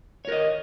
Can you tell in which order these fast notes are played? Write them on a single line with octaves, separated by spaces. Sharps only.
C#5 A#4 D#5